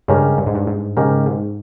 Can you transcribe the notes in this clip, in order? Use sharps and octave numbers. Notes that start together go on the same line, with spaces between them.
G2 C#3 G#3 C#4 G4 A#4
G2
G#2
G2
G#2
G#2 C#3 G#3 C#4 G4 A#4
G#2